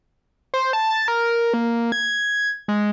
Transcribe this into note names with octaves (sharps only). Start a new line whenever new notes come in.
C5
A5
A#4
A#3
G#6
G#3